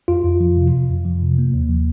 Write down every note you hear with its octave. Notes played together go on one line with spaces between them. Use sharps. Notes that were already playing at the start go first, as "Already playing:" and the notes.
F2 F4
F2
F3
C3
F2
F2
F3
C3
A#3
D#2
F3